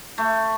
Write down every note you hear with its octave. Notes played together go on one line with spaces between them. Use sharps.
A3